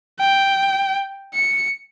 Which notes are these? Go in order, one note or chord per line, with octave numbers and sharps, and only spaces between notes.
G5
C#7